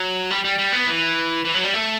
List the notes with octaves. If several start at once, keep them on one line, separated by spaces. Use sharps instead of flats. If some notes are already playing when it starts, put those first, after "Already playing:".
Already playing: F#3
G3
G3
G3
B3
E3
E3
F#3
G3
A3